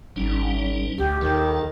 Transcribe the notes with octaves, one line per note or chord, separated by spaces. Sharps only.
G#1 G3 C#4 D#4
D2 G4
D#2 D#3 A4